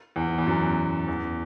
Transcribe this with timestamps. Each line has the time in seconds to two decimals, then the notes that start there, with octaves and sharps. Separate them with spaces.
0.16 E2
0.38 E2
0.47 F#2
1.08 E2